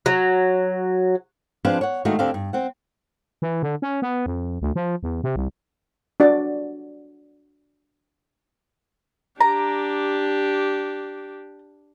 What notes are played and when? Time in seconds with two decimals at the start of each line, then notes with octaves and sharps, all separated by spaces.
0.06 F#3
1.65 F3 C4 D4 G#4 B4 F5
1.81 C#5 F#5
2.05 D#3 G#3 A3 D4 F#4 F5
2.19 D2 D3 C4 D4 G4 F5
2.34 G2
2.53 C4 F#5
3.42 E3
3.63 D3
3.82 C#4
4.02 B3
4.26 F2
4.62 D2
4.76 F3
5.03 E2
5.24 C3
5.36 C2
6.20 D4 F#4 D5
9.41 D4 G4 A#5